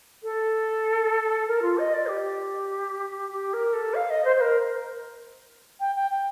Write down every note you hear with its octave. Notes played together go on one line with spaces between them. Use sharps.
A4
A#4
F4
D#5
D5
G4
G4
A#4
A4
F5
D#5
C5
C5
A#4
G5
G5
G5